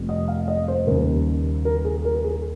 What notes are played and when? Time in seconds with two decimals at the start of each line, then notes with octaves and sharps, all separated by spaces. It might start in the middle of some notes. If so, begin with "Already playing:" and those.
Already playing: F1 F2 C3 G3
0.09 D#5
0.28 F5
0.48 D#5
0.68 C5
0.87 D#2 C#3 G3 A#3 A#4
1.65 A#4
1.85 G#4
2.05 A#4
2.16 A#4
2.24 G#4